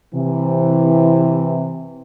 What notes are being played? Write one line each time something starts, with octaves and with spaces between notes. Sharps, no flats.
C3 E3